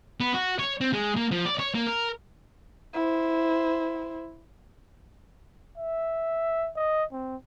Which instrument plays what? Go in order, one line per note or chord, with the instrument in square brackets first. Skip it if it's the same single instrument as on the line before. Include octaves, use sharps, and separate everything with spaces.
[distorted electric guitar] B3
F#4
C#5
C4
G#3
A#3
F3
D5
C#5
A#3
A#4
[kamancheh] E4 C5
[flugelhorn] E5
D#5
C4